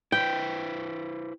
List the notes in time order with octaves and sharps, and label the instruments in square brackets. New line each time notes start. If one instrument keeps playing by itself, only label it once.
[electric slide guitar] E4 B4 C5 [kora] G5